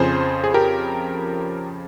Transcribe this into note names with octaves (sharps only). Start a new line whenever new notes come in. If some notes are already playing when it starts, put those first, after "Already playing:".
Already playing: F2 C#3 F3 G#4 C5
G#4
G4 A#4